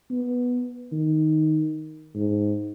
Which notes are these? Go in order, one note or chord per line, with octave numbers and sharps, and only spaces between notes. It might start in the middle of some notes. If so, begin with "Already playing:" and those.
B3
D#3
G#2